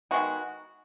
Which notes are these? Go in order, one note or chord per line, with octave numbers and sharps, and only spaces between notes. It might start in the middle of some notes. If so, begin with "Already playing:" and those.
D#3 G#3 B3 F#4